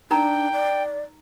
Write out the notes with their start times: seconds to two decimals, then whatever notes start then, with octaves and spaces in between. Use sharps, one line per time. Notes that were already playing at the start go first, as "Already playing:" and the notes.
0.11 D4 D#4 A#4 G5 A#5
0.53 D5